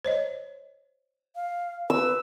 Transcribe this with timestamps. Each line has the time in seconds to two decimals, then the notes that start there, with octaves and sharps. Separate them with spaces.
0.05 C5 C#5 D#5
1.36 F5
1.90 B4 E6